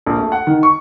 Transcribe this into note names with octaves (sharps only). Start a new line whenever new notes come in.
A#1
A3
F#5
D#3
C#6